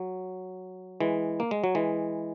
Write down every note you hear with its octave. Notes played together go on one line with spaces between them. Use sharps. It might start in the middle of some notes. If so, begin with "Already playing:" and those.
Already playing: F#3
E3 G#3
A#3
G#3
F#3
E3 G#3